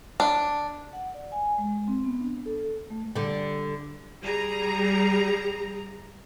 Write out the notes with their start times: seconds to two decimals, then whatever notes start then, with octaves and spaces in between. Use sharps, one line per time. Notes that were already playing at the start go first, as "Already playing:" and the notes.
0.20 D4
0.93 F#5
1.14 D5
1.32 G#5
1.58 G#3
1.88 C4
2.05 B3
2.21 D4
2.46 A4
2.90 A3
3.16 D3 G3
4.22 G3 G#4 A#5